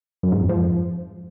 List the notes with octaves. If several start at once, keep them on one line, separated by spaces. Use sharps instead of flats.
F#2
G#2
F2
F3